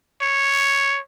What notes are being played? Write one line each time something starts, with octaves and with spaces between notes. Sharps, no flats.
C#5